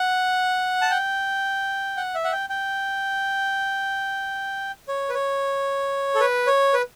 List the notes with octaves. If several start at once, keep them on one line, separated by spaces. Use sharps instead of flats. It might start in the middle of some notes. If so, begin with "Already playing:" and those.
Already playing: F#5
A5
G5
F#5
E5
F#5
G5
G5
C#5
B4
C#5
A4
B4
C#5
B4